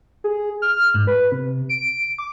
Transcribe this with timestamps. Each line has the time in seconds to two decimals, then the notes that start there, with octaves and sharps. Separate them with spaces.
0.24 G#4
0.62 F6
0.94 G#2
1.07 B4
1.32 C3
1.69 D7
2.18 D6